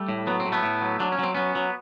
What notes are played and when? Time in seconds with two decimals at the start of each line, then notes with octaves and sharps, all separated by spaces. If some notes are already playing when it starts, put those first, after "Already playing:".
Already playing: G3 A3
0.09 A2
0.27 F#3 B3
0.40 C4
0.46 A2
0.52 A3 B3
0.63 A2
0.81 F#3
1.00 F#3 D4
1.12 C#4
1.19 F#3 C4
1.34 F#3 B3 C#4
1.55 F#3